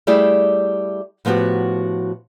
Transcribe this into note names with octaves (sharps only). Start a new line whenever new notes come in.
G3 A3 E4 G4 G#4 D5
A2 F3 B3 F#4 G4